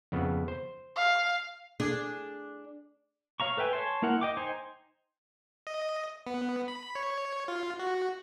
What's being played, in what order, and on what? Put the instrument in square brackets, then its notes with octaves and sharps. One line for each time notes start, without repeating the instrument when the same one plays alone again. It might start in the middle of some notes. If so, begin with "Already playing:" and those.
[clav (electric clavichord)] F2 C#3 B3
C5
[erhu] F5
[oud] D4 G#4
[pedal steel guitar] C#5 F5 A#5 C#6
A4 B4 E5 G5 G#5
C#5 G#5 A5 C6
A#3 E4 A#4 F#5
D#5 G5 D6
D#4 C5 G5 G#5
[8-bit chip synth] D#5
B3
B5
C#5
F4
F#4